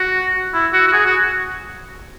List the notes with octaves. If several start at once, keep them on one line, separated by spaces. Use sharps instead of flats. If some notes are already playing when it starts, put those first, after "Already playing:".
Already playing: F#4
E4
F#4
F#4
G#4
F#4